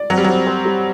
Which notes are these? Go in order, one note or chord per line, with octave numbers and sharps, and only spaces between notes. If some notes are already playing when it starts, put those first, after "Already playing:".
Already playing: D5
F#3 C4
G3
F#3 C4
C5
G3